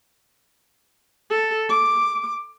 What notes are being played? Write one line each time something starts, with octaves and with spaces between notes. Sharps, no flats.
A4
D6